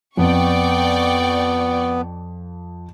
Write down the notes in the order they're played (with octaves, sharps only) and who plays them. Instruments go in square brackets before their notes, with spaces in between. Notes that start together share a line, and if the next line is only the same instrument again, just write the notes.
[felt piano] F2 [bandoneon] B3 [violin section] D5 G5 C#6